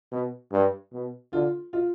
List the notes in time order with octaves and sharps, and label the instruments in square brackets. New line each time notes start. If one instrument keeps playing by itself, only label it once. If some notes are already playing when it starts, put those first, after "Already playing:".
[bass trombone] B2
G2
B2
[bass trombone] D3 [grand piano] F4
[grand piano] F4